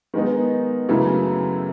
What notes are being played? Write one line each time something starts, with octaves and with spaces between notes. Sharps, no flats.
D#3 G#3 B3 D#4
F#2 C#3 E3 A3